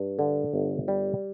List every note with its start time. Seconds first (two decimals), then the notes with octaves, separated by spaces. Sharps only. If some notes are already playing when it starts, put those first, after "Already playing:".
Already playing: G2
0.19 D3
0.54 G1
0.88 G3